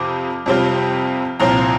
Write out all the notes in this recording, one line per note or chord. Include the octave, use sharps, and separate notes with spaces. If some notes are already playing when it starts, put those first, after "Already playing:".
Already playing: F2 C3 C4 F4 D6
F2 C3 G3 C4 F4
C2 A#2 F3 C4 F4 A#5